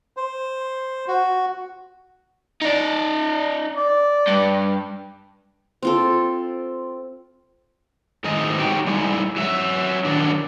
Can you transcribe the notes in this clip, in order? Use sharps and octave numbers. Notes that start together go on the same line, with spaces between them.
C5
F#4
D#4 D5
D5
G2
C4 F4 A4
G#2 D#3 G#3 A3 D#4 D#5
F#3 D#4 F#4 G4 G5
G3 G#3 D#4 E4
F#3 E5
D#3 F#3 D4